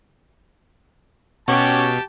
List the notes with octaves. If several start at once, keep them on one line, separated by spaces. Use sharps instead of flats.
B2 C#4 F#4 G4 A5